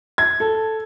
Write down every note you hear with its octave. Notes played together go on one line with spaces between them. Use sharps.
G#6
A4